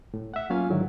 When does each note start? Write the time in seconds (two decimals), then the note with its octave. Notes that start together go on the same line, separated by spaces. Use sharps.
0.14 A2
0.34 E5 F#5
0.50 F#3 A#3 C#4 F4 F5 G#5
0.70 G#2 D3 D#3 F#3 E4